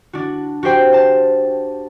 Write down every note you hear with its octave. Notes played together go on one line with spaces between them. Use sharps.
D4 F#4
F#4 G4 C5 G5
C5 A5